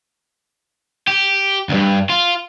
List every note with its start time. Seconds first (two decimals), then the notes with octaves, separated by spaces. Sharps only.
1.08 G4
1.69 D2 G2
2.09 F4